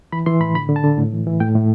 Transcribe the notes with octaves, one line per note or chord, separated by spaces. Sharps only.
E3 B5
E3 C6
A2 B5
D3 B5
D3
A5
D3
A2
E3
E3
A2 G5
A2